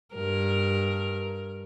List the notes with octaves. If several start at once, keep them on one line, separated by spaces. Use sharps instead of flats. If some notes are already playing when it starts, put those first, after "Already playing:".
G2 A#4